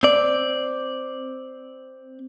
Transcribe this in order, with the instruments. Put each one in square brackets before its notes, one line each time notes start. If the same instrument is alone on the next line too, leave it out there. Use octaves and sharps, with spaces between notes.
[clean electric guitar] C4 D5